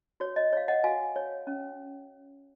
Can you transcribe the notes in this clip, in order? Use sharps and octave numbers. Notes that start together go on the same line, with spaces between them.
F#4 C#5
D#5
C#5 F5
D#5 F#5
F#4 F5 G#5
C#5
C#4